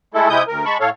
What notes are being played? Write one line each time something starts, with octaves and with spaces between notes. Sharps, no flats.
G#3 A3 E4 A4
C3 G#3 E4 D#6 G6
D2 A#4
G#3 A5 B5 C#6
A2 A4 C#5 F5